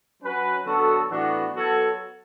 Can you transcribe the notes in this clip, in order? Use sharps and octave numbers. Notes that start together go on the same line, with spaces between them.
F#3 C#4 F#4 B4
D3 F#3 B3 F#4 A4
A2 E3 B3 D4 F#4
F#3 B3 F#4 A4 C#5